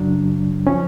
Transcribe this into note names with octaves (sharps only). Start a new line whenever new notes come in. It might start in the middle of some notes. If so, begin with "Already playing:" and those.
Already playing: F#2 C#3 F#3 D4
F3 C#4